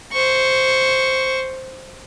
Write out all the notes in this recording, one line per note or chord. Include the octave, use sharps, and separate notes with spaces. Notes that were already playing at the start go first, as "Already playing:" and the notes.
C5 C#6